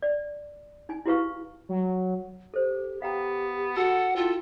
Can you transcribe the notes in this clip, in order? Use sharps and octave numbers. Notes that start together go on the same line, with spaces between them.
D5
D#4 G#5
E4 F#4 G4 B4 F5 C#6
F#3
G4 A4 C5
B3 G4 F5 G5 A#5
F#4 A4 F#5
E4 F4 A4 F5 G5